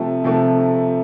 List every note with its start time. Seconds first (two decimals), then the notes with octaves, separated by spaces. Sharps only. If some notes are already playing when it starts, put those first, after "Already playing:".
Already playing: C3 F3 A3
0.24 C3 F3 A3